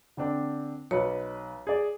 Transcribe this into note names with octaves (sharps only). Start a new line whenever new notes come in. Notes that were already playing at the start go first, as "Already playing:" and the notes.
D3 C4 D4
B1 B4 C#5
G#4 D5